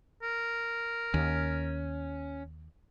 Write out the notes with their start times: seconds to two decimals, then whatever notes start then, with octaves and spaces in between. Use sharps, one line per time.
0.22 A#4
1.14 D#2 C#4